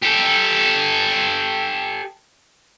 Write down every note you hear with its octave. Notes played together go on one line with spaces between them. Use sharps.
G4 A4